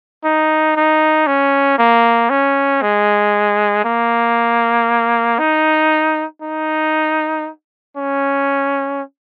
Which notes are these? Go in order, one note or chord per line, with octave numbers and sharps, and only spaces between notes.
D#4
D#4
C#4
A#3
C#4
G#3
A#3
D#4
D#4
C#4